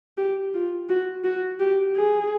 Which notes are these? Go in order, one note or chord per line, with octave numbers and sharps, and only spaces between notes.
G4
F4
F#4
F#4
G4
G#4